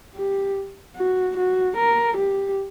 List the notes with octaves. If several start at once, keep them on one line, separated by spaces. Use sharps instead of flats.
G4
F#4
F#4
A#4
G4